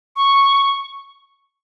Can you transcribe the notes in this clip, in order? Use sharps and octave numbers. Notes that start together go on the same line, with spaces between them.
C#6